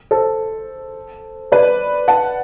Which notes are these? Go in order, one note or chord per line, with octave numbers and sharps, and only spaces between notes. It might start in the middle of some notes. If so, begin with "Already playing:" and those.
A4 C5
B4 D5
F#5 A5